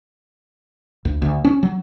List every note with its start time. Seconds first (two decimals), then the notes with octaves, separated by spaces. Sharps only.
1.05 D2
1.22 D2
1.44 C#4
1.63 F#3